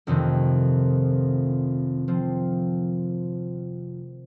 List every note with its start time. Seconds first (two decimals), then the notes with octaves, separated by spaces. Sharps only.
0.07 F1 F2 C3 D#3
2.08 F3 C4